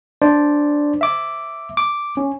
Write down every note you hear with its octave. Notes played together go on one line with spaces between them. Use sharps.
D4 C5 D5
E5 D6
D6
C#4